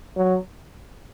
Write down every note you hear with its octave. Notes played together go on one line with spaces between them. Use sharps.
F#3